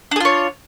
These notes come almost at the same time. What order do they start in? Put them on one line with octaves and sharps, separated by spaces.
D4 G#4 F4 C#5